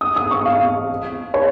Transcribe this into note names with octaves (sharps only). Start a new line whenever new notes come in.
D#6
D#6
C#6
F5
C#5